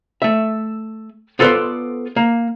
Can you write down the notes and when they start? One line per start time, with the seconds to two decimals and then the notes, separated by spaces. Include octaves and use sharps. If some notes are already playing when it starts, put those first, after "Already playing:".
0.22 A3 E5
1.39 B3 F4 A4 B4 C5 D5
2.16 A#3